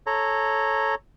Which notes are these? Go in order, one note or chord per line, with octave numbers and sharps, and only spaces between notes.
A4 C#5 A#5